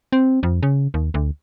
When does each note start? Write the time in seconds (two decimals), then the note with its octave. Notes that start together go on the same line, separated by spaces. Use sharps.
0.12 C4
0.43 F2
0.63 C#3
0.94 D#2
1.14 D2